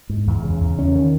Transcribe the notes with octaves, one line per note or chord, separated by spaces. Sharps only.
G#2
E2
C#3
E2
C#4
D#3